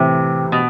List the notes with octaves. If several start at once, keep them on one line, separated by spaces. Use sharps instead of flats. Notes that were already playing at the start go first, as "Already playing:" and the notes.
Already playing: A2 C3 E3 G3 C4 E4
B2